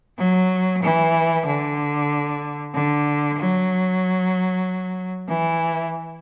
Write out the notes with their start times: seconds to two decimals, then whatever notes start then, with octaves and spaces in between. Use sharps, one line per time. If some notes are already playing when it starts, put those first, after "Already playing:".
0.18 F#3
0.83 E3
1.46 D3
2.74 D3
3.38 F#3
5.29 E3